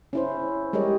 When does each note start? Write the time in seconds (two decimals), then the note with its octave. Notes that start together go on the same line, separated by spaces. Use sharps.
0.13 C#4 E4 C5
0.73 G3 G#3 G4 A#4 C#5 D#5